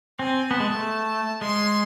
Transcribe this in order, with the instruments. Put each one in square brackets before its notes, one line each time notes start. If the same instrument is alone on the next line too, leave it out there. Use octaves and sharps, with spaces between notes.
[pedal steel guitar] C4 [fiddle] G#5
[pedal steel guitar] B3 [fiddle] A5
[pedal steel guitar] G#3
A3
[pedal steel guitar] G#3 [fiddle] C6